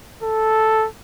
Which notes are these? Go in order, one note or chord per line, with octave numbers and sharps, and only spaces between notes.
A4